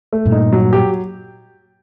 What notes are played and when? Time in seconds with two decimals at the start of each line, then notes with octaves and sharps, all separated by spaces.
0.13 A3
0.25 G2 A#2
0.32 D#4
0.52 F#3
0.73 G4